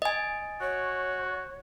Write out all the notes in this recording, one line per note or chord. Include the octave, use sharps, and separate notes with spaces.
D#5 G#5
F#4 C#5